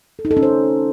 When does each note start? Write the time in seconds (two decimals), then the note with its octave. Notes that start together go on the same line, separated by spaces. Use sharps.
0.19 A4
0.25 D#4
0.31 A4
0.37 C#4
0.43 C5